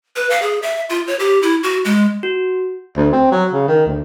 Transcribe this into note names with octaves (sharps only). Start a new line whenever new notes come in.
B4
F5
G#4
E5
F4
C#5
G4
E4
F#4
G#3
F#4
D2
C4
F#3
C#3
D#3
D2